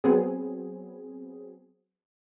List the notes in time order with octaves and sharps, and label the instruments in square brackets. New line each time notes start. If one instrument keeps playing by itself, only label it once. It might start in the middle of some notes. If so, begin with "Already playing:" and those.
[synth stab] F#3 B3 C4 G#4